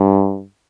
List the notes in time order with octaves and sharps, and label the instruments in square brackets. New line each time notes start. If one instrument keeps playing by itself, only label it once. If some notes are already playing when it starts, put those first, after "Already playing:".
Already playing: [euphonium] G2